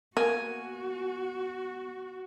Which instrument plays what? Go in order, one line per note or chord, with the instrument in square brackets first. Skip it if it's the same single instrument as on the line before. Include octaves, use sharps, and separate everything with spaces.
[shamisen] A#3 [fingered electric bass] B3 [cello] F#4 [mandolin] G#5